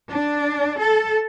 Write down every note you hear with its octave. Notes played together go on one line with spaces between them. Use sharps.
D4
A4